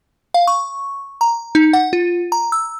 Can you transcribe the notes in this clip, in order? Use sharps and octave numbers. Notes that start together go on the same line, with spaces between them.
F5
C#6
A#5
D#4
F#5
F4
A#5
E6